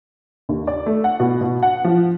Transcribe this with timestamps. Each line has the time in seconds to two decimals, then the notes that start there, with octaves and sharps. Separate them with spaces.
0.49 D#2
0.67 D5
0.86 A3
1.04 F#5
1.20 B2
1.41 B2
1.63 F#5
1.84 F3